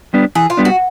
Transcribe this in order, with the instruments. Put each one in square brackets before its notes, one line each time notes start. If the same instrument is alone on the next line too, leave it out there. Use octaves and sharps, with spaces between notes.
[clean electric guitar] G3 B3 D4
[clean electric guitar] E3 [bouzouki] G#4
[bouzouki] F4
[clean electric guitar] G3 B3 D4
[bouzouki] F#4